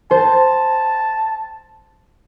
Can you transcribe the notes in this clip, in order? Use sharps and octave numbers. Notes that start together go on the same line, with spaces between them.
C5 A5